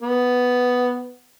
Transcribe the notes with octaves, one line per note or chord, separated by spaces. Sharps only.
B3